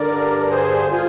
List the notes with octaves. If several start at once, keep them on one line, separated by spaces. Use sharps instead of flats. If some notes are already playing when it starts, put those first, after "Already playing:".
Already playing: G2 D3 A#4 D5
G#4 C5
F4 G#4